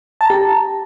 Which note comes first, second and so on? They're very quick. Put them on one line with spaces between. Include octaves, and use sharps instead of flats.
A5 A#5 G4